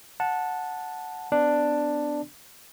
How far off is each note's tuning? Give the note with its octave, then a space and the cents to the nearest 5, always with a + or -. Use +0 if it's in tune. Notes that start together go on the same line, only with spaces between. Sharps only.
F#5 -15 A5 +0
B3 +30 D4 +5